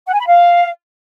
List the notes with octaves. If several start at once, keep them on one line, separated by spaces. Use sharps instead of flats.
F#5
G#5
B5
F5